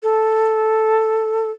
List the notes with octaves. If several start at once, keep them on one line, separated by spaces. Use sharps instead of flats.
A4